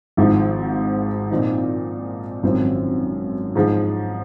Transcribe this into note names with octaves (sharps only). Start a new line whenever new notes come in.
G#1 G#2 F3
A#2 F3 C4 D#4
G#1 F#2 F3 C4
G#2 F3 G#3